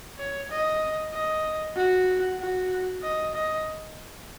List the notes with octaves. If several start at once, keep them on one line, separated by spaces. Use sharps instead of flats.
C#5
D#5
D#5
F#4
F#4
D#5
D#5